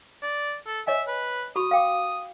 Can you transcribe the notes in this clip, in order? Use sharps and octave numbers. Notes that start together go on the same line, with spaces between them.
D5
A4
C#5 D#5 E5 G#5
B4
F#4 B5 C#6 D#6
F5 G5 D6